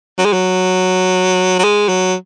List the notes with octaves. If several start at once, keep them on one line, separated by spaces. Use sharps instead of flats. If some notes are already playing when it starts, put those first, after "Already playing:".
F#3
G#3
F#3
F#3
G#3
F#3